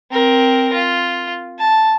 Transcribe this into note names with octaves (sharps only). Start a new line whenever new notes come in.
C4 A#4
F4
A5